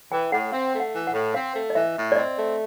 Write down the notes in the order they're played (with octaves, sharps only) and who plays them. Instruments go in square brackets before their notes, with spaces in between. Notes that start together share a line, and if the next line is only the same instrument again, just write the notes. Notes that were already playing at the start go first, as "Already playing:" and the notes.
[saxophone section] E3 [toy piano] G5
[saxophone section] A2 [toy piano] F#5
[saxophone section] C4 [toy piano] F5
[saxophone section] A3
[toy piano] F#5
[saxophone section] E3
[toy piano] F#5
[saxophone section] A2
[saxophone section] C4 [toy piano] F5
[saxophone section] A3
[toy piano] D#5
[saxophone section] E3 [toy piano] E5
[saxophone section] A2
[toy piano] D5
[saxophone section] C4 [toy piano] D#5
[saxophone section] A3